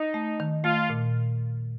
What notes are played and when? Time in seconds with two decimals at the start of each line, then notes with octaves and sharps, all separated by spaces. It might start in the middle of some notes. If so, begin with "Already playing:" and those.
Already playing: D#4
0.14 A3
0.40 D#3
0.64 A3 F4
0.90 A#2